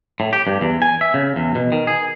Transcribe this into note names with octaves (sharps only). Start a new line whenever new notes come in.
A2
G4
G2
E2
G#5
E5
C#3
E2
B2
D#3
G#4